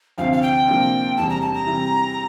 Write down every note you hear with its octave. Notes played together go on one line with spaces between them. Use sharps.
D2 C3 F3 C4 F5
F5
G5
C3 F3 A#3 D4
E1 E2 C3 G3 A5
A#5
A5
A#5
C3 E3 G3